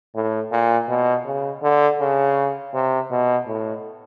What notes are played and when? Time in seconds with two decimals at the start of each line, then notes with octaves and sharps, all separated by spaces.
0.15 A2
0.51 A#2
0.89 B2
1.25 C#3
1.63 D3
2.00 C#3
2.74 C3
3.11 B2
3.47 A2